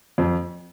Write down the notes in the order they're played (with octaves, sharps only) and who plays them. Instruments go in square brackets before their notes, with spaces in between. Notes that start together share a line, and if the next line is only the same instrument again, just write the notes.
[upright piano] F2